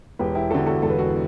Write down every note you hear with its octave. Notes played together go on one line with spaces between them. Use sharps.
E1 G4 B4
E4 G4
E2 D3 F#4 A4
F#4 A4
E1 A4
B4
F#4 A4